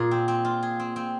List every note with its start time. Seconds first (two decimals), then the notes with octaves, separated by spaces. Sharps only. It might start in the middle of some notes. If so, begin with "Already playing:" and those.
Already playing: A#2 G#4
0.11 C4
0.28 C4
0.45 F4
0.63 G#4
0.80 C4
0.96 C4